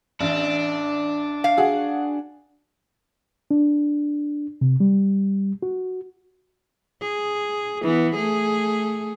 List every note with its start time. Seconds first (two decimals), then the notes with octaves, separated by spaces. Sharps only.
0.20 A1 D4
1.44 F5
1.57 F#4 G#4
3.51 D4
4.61 C3
4.80 G3
5.62 F#4
7.01 G#4
7.83 E3 B3
8.16 A3 G#4